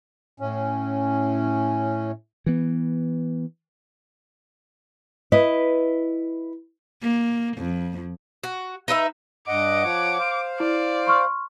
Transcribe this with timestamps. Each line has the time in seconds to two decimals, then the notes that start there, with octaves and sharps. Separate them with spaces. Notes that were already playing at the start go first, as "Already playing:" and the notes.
0.40 A2 C#4
2.46 E3 B3
5.32 E4 B4 D#5
7.02 A#3
7.58 F2
8.43 F#4
8.88 D#4 B4 D#5 E5
9.48 G2 D#5 F#5 D6
9.84 F3 C#5 F#5
10.19 C5 F5
10.60 E4 D5
11.07 C6 C#6 F6